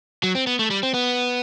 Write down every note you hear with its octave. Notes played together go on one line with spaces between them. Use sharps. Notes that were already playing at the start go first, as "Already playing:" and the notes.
F#3
C4
B3
A3
G3
C4
B3